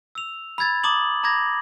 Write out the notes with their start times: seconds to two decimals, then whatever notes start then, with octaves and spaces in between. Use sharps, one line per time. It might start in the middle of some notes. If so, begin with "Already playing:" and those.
0.15 E6 F7
0.58 B5 E6 G#6 A6
0.84 A#5 D6 D#6 F#7
1.23 A#5 B5 D6 G#6 A#6